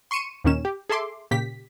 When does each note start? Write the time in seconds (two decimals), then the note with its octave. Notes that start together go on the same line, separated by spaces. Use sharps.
0.11 C6 C#6 C#7 D#7 E7
0.44 D#2 A#2 D#3 C#4 E7
0.65 G4
0.89 G#4 A4 E5 C6 D6
1.31 A#2 C#3 G4 B6